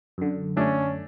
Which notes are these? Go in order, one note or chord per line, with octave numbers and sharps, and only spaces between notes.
F#2 D3
A3 C#4 D4